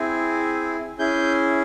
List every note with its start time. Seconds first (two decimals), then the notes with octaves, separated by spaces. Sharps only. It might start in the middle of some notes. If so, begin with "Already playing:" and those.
Already playing: C4 E4 G#4
0.98 C#4 E4 G#4 G6